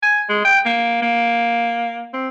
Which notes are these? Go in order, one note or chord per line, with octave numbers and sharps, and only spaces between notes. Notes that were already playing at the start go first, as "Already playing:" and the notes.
G#5
G#3
G5
A#3
A#3
C4